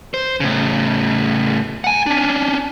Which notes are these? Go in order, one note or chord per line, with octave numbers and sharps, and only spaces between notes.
C5
A2 C#3
F#5 G#5
C#4 D4